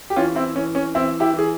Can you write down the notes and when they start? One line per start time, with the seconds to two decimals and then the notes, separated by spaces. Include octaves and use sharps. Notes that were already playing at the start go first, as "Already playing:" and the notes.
0.10 G4
0.16 E3 C#4 F4
0.36 C4 E4
0.55 E3 C#4
0.75 C#4
0.94 E3 C4 E4
1.20 E4 G4
1.33 E3
1.38 G#4